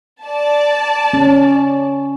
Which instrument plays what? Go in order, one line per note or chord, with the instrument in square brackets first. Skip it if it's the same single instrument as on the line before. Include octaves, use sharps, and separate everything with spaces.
[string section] D5 A5
[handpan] C#4